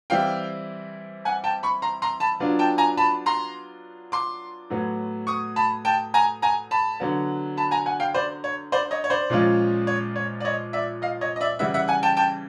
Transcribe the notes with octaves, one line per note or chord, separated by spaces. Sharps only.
E3 G3 C4 E4 F5 G5
F#5 G#5
G5 A5
B5 C#6
A#5 C6
A#5 C6
A5 B5
F#3 B3 D4 F4
G5 A5
G#5 A#5
A5 B5
A#5 C6
C6 D6
A2 F#3 B3
C#6 D#6
A5 B5
G5 A5
G#5 A#5
G#5 A#5
A5 B5
D3 F#3 B3
A5 B5
G#5 A#5
F#5 G#5
F5 G5
C5 D5
C#5
C5 D5
C#5 D#5
C#5
C5 D5
A#2 F3 G#3 C#4 F4
C#5
C#5
D5
C#5 D#5
D5 E5
D#5 F5
C#5 D#5
D#5
D5 E5
C#3 E3 G3 E5 F#5
E5 F#5
F#5 G#5
G5 A5
G5 A5